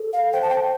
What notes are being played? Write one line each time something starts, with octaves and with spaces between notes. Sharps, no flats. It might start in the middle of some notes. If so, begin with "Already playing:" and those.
Already playing: A4
F5
C5 G5
A5
G5